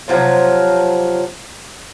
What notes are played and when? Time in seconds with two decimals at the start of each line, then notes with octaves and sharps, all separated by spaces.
0.08 C3 F3 F#3